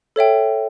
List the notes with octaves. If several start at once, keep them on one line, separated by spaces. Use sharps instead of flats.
A4 C#5 E5 G5